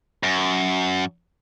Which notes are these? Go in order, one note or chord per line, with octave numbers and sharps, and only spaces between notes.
F#2